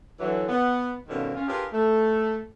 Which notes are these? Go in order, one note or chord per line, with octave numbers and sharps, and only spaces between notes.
D3 E3 F#3
B3
G2 B2 D3 D#3 A#3 C#4
C#4 F4
D4 F4 G4 G#4 A#4 B4
A3